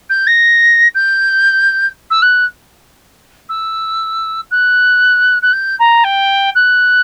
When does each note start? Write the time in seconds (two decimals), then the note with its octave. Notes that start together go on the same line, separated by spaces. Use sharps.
0.10 G6
0.27 A#6
0.95 G6
2.11 E6
2.22 F#6
3.49 E6
4.51 F#6
5.42 F#6
5.53 G6
5.79 A#5
6.04 G5
6.55 F#6